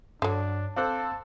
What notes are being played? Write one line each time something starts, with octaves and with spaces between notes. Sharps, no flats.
G2 D3 F#3 D4
C4 A4 C5 F5 A5 D6 F#6